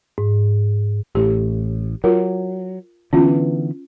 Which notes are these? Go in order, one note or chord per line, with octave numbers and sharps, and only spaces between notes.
G#2
A1 A2 G4
F#3 F4 A#4
D3 E3 B3 C#4 F4